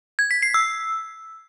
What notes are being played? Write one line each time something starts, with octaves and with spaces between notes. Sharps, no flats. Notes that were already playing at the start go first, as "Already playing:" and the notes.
G#6
B6
C7
E6